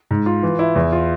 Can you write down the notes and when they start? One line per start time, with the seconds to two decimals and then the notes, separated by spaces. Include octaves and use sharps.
0.11 G#2
0.26 F4
0.43 E3
0.59 E4
0.76 E2
0.92 F4